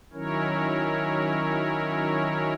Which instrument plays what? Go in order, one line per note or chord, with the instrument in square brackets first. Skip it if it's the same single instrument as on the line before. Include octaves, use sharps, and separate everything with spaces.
[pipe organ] D#3 F#3 C#4 E4 A#4 C#5